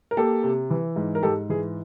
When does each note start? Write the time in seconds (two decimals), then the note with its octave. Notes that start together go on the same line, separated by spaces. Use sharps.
0.11 A#4
0.17 A#3 G4 A4
0.43 C3
0.70 E3
0.96 G#2
1.15 A#4
1.23 G#2 G4 A4
1.49 E3 G#4